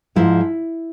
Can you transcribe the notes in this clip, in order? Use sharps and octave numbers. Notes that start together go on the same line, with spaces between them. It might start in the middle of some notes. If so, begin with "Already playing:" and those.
G#2 F3 G#3 E4